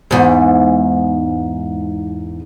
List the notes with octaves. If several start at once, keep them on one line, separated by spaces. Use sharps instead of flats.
E2 G#2